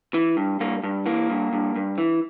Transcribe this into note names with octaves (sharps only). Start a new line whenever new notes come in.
E3
G2
G2 A#3
G2
E3 A#3
G2
G2
G2
E3